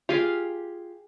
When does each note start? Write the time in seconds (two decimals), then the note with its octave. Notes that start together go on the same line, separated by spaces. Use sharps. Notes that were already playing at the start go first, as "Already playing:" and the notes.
0.09 F4 G4 G#4 F5